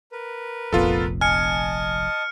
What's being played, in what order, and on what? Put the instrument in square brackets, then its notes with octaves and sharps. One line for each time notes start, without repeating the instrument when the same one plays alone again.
[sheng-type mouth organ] A#4 B4
[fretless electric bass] F1 A#1 F2 [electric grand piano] B3 F4 A4
[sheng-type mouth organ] D#5 A5 [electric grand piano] G#5 [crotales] F6 C#7